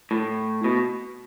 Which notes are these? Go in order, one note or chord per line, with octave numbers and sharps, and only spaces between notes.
A2
B2